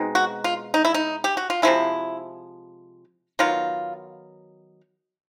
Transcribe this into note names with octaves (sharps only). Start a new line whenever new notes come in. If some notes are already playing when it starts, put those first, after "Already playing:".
Already playing: B2 G#3 C4 D#4
F#4
F4
D#4
E4
D#4
G4
F#4
F4
C3 F3 G#3 E4
D#3 F#3 B3 F4